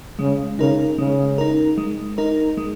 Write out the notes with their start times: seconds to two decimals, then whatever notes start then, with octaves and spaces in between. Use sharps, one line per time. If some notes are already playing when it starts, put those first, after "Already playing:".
0.19 C#3 G#3
0.59 C#3 D#4 A#4
0.98 C#3 G#3
1.38 D#4 A#4
1.78 G#3
2.18 D#4 A#4
2.57 G#3